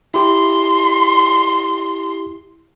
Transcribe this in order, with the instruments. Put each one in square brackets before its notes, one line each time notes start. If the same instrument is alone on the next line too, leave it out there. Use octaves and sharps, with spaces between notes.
[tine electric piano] E4 G4 [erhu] C6